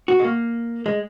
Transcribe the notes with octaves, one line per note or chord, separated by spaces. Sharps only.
F#4
G#3
A#3
G#3